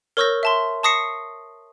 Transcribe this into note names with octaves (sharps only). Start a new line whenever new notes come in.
A#4 C#5 C#6 E6 G6 A#6
E5 A5 C6
A5 C#6 D#6 A#6 C7 C#7